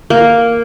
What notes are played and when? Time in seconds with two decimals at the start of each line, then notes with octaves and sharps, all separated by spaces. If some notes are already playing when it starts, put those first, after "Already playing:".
0.10 A#3